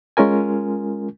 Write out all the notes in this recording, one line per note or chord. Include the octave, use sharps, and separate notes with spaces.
G#3 C#4 F4 A#4 G#5